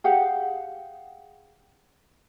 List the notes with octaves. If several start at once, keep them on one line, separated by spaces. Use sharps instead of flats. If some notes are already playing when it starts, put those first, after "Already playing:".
G4 G#4 F5 F#5